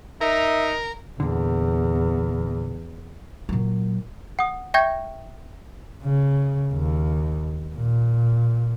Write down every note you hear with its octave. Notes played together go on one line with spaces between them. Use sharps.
D#4 A#4 E5
E2 A#2 D3
A#2 F#3
F#5 D#6
E5 G5 C#6 G6 G#6 A#6
C#3
D#2
A#2